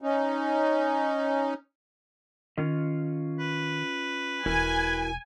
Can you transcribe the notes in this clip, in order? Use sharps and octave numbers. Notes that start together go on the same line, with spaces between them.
C#4 D#4
D#3 C#4 F4 D#5
B4
E1 E4 F#4 A#4 G#5